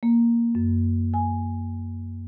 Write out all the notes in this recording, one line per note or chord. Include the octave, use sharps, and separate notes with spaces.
A#3
F#2
G#5